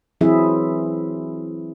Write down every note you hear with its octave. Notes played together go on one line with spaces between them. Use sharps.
E3 F#3 C4 E4 G#4 E5